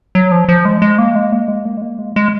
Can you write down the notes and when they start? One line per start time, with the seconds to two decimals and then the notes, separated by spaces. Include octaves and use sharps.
0.15 F#3
0.32 F3
0.48 F3
0.65 G#3
0.82 G#3
0.98 A#3
1.15 G#3
1.32 A#3
1.48 G#3
1.65 A#3
1.77 G#3
1.82 A#3
1.99 G#3
2.16 G#3